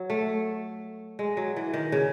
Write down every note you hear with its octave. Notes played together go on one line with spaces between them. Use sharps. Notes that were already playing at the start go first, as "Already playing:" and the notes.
Already playing: F#3
A3
G#3
F#3
E3
D#3
C#3